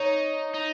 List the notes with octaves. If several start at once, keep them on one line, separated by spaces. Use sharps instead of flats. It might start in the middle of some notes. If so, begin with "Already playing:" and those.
Already playing: D#4 C#5
D#4